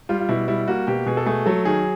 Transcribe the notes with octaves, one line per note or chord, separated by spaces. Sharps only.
G3 F4
F4
B2 E4
G3 E4
A#3 F#4
B2 G4
B2 G#4
A4
A3 G#4
F#3 A4
D#3 G#4